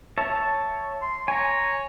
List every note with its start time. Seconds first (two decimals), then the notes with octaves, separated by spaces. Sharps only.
0.18 C#5 E5 A5
1.02 C6
1.28 C#5 G#5 A#5